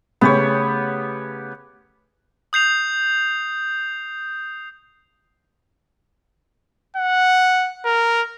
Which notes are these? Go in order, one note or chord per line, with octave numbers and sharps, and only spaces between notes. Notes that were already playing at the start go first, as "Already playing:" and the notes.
C#3 A3 B3 C#4 G4 C#5
D#6 G6 C7 F7
F#5
A#4